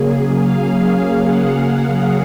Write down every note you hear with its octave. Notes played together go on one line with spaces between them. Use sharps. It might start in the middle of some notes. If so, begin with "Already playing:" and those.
Already playing: C#3 F#3 A#3 G#4
F5
F#5
F5